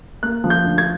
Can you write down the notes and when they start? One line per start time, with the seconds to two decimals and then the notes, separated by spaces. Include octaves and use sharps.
0.23 A#3 F#6
0.44 F3
0.50 G6
0.64 D2
0.78 G#6